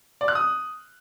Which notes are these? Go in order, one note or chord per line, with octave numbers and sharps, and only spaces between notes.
D5
F#6
D#6